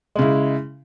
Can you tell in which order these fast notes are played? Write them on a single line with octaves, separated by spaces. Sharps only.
G#3 C#3 E4